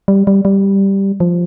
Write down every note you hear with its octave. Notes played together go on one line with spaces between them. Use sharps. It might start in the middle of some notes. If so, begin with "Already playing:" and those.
G3
G3
G3
F3